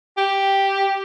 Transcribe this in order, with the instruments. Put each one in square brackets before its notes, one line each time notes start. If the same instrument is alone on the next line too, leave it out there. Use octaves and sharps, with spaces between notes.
[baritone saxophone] G4